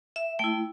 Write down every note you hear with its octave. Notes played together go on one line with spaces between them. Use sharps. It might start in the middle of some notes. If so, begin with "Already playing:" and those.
E5
A3 E4 G5